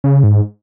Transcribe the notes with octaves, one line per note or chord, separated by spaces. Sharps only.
C#3
G#2